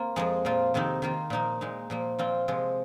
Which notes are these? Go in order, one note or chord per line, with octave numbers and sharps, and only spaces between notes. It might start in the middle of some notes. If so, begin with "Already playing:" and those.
Already playing: A#3 C4 F4
F2 F3 G#3
A#2 F3 A#3 F4
F2 C3 D#3 C4 D#4
D#3 A#3 F4
A#2 F3 A#3 D#4
A#2 G#3 D#4
A#2 F3 A#3
A#2 F3 C4 F4
C3 F3 G#3